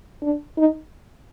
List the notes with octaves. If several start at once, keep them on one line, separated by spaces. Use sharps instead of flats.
D4
D#4